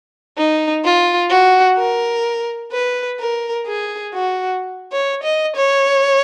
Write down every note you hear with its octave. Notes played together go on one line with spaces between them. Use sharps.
D#4
F4
F#4
A#4
B4
A#4
G#4
F#4
C#5
D#5
C#5